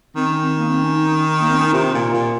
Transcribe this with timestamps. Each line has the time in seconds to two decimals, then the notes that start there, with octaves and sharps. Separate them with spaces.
0.16 D#3 C4
0.28 C#4
0.40 C4
0.58 A#3
0.70 C4
0.83 C#4
0.95 D#4
1.41 A#3
1.50 C4
1.58 C#4
1.66 D#4
1.73 C3 F4
1.94 A#2
2.14 A#2